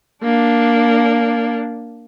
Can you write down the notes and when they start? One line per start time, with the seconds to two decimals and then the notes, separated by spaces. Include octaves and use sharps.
0.23 A#3 D4